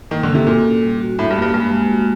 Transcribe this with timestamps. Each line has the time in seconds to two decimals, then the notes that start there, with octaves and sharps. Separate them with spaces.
0.11 D#3 A#3
0.23 D3
0.30 A4
0.35 C3
0.47 A#2 F#4
0.65 C#4
0.82 G3
1.01 F#4
1.19 A2 D4
1.31 G2
1.36 A#3
1.42 G2
1.54 G2 G#3
1.72 G#3
1.90 F#4